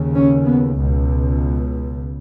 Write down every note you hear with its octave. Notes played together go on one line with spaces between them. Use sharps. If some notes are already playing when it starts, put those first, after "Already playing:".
Already playing: D#2 C#3
C#4
B3
C#2 B2